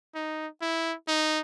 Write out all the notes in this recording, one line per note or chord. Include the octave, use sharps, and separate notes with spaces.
D#4
E4
D#4